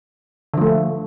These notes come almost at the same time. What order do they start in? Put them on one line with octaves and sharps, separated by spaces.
D3 F3 A3